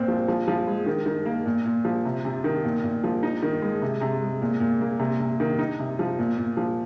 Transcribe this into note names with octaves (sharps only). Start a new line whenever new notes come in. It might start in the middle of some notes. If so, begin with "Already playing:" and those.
Already playing: A#2 C4
F3
F3
F3
G#3
D#3
D#3
A#3
A#2
A#2
F3
C3
C3
D#3
A#2
A#2
F3
D#4
D#3
G#3
C3
C3
G#3
A#2
A#2
A#3
C3
C3
D#3
D#4
C3
F3
A#2
A#2
F3